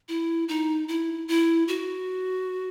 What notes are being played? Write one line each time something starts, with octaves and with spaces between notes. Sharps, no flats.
E4
D#4
E4
E4
F#4